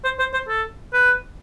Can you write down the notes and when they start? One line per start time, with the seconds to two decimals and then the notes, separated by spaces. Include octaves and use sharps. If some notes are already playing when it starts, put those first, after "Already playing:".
0.04 C5
0.19 C5
0.33 C5
0.49 A4
0.93 B4